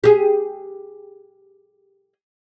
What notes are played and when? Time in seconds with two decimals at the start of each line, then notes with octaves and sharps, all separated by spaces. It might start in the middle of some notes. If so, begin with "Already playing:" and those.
0.04 G4 G#4